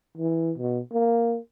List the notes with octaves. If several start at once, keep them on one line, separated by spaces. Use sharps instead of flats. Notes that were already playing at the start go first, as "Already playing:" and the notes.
E3
B2
A#3